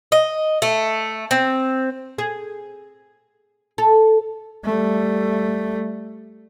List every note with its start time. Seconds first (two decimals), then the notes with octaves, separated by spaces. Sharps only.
0.12 D#5
0.62 A3
1.31 C4
2.18 G#4
3.78 A4
4.65 G3 A3